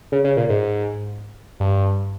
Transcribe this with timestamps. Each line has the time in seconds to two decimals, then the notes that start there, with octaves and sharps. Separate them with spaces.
0.12 C#3
0.24 C#3
0.37 A#2
0.49 G#2
1.60 G2